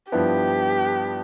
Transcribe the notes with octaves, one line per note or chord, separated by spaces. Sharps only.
G2 F3 B3 E4 G4 B4